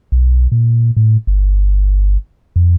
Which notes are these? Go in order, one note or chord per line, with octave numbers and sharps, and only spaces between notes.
B1
A#2
A2
G1
F2